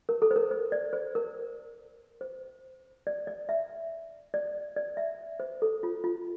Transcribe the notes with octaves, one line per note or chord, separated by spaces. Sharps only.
A#4
A4
C5
A#4
C5
D5
C5
A#4
C5
D5
D5
E5
D5
D5
E5
C5
A4
F4
F4